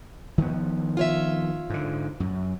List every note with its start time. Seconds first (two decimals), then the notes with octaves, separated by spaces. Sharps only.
0.38 D#3 F3 B3
0.97 F4 C#5 E5
1.70 G#2 D3
2.20 F#2